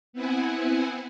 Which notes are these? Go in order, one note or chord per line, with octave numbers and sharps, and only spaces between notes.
B3 C4 E4 F#5 G#5